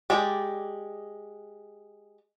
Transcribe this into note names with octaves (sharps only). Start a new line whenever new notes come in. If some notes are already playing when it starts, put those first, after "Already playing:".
G#3 G4 D5